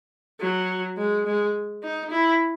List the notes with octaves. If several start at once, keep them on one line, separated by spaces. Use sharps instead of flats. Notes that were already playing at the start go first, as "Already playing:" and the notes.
F#3
G#3
G#3
D#4
E4